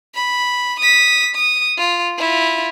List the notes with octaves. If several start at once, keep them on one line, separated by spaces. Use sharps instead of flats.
B5
D#6 B6
D#6
F4
E4 F4